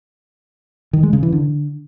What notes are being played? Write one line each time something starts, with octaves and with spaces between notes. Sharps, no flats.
D#3
G#3
C#3
E3
D3